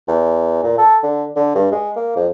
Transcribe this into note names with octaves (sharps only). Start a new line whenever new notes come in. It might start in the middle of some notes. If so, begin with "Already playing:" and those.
E2
A#2
A4
D3
D3
G2
G#3
A#3
F2